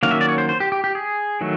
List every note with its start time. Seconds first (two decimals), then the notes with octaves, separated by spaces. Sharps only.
0.03 D#3 F#3 A#3 C#4 F5
0.11 E5
0.21 D5
0.29 C#5
0.38 C5
0.49 C5
0.60 G4
0.72 G4
0.84 G4
0.95 G#4
1.41 D#3 F#3 A3